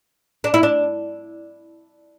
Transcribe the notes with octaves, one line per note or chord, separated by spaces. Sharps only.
D4
E4
D4